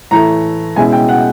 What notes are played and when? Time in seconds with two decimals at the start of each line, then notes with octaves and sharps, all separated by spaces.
0.11 A2 E3 A3 A#5
0.76 B2 G#3 C#4 E4 G#5
0.92 G5
1.09 F#5